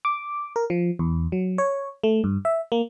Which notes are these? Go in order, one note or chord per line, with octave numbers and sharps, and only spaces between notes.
D6
A#4
F3
E2
F#3
C#5
A3
G2
E5
A#3